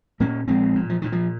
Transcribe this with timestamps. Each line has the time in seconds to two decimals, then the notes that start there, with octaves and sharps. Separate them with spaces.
0.20 A#2 A#3 C#4
0.47 A#1 G#3 C4
0.75 A#2
0.89 F3
1.02 A#2 D#3
1.12 F3